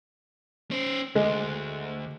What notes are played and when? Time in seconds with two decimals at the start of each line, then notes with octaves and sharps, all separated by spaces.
0.71 C#4 C5
1.15 D2 G#3